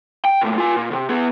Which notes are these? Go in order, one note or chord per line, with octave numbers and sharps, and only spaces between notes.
G5
A#2 A3
F4 G#5
A#2
D2 C3
B3 G#4